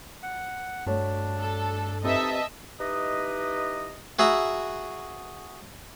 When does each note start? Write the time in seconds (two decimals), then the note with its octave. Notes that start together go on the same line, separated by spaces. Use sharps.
0.23 F#5
0.86 G2 A3 D4 F#4 C#5
1.38 A4
2.04 C4 D#4 G4 A4 B4 D#5 E5 A5
2.79 D#4 E4 G4 B4 D#5
4.19 F#4 G#4 E5 A#5 B5